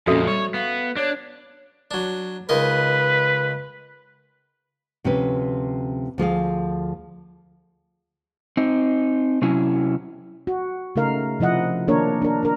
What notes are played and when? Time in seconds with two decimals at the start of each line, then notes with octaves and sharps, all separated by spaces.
0.07 F2 A#2 C#4 F#4 A4 E5
0.27 G3 C#5
0.54 B3 F5
0.96 D4 C#5
1.91 F#3 D4
2.49 C#2 D#4 A#4 B4
5.04 D2 C3 F3 C#4 B4
6.18 D2 F3 G#4 F5
8.57 C4 D#4
9.42 C3 F#3 C#4 E4
10.47 F#4
10.96 C#3 A3 D#4 A#4 F5
11.39 C3 F3 E4 D#5 F#5
11.88 D#3 A#3 D4 A#4 C#5
12.22 D4 A#4
12.43 D4 A#4